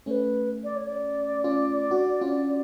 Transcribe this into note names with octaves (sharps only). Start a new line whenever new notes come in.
A3 C#4 B4 C#5
D5
C#5
D5
C#4 F4
D4 F#4
C#4 F4